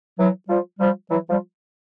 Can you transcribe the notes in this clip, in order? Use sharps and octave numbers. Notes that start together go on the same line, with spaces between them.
E3 F#3
F3 G3
F3 G3
E3 F#3
F3 G3